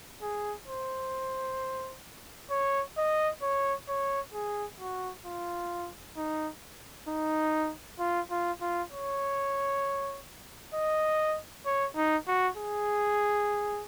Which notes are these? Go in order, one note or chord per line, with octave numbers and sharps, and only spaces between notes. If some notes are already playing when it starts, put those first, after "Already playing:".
G#4
C5
C#5
D#5
C#5
C#5
G#4
F#4
F4
D#4
D#4
F4
F4
F4
C#5
D#5
C#5
D#4
F#4
G#4